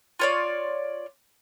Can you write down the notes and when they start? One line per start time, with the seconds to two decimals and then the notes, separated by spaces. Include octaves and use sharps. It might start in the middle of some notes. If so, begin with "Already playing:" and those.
0.19 F4 C#5 D5